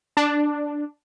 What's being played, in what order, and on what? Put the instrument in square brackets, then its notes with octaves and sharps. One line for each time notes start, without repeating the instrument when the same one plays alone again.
[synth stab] D4